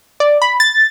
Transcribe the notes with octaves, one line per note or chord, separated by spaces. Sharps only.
D5
B5
A6